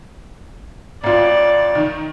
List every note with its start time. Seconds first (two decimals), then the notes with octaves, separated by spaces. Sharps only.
1.04 A1 F4 D5
1.75 D#3